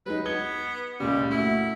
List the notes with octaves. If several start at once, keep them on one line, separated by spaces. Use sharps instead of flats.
F#3 G#3 D#4 B4
B3 G#6 G7
C#2 A#2 C#3 G3
A3 E4 F#4